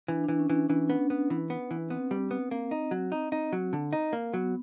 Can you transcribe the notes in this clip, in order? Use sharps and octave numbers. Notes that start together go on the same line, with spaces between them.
E3 D4
D4
E3
C#4
E3
C#4
E3
B3
B3
E3
B3
E3
B3 C4
G3
B3
A#3
D#4
F#3
D#4
D#4
F#3
D3
D#4
A#3
F#3 B3